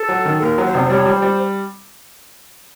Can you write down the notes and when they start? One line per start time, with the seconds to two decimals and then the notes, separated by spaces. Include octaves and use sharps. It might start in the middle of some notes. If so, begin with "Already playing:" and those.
Already playing: A4
0.09 F#3
0.25 D#3
0.41 D#2 A#4
0.58 F#3
0.66 C5
0.74 F1
0.89 G3 C#5
1.06 G3
1.14 C5
1.22 G3